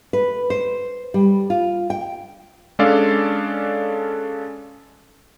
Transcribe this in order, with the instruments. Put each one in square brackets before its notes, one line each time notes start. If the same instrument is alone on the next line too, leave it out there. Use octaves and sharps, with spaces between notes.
[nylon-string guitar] B4
C5
G3
F4
G5
[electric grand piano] G#3 C#4 D4 A4 D5 F5